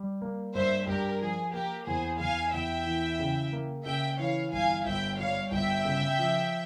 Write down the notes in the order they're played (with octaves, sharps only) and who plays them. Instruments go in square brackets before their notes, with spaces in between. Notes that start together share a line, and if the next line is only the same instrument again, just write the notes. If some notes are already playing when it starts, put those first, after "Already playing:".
Already playing: [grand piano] G3
A#3
[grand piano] G2 [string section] C5 E5
[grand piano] G2 [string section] G4 A#4
[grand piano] F3 [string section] G#4
[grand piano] A#3 [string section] G4 A#4
[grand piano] E2 [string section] G#4 C5
[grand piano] E2 [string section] F5 G#5
[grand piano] E2 [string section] E5 G5
[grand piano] E3
C#3
A#3
[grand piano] C#3 [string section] E5 G5
[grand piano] E3 [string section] C#5 F5
[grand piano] G1 [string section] F5 G#5
[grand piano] G1 [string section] E5 G5
[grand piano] G3 [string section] C#5 F5
[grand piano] G1 [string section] E5 G5
[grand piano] C#3
F3